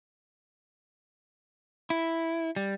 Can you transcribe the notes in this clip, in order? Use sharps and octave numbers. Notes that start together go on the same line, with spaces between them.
E4
G3